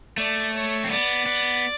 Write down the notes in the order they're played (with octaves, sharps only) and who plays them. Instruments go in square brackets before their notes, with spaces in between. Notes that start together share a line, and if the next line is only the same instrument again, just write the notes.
[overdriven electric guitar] A3 [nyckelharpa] D5
[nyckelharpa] C#5
[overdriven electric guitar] C4
[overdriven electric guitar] B3 [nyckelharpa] D5
[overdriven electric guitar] B3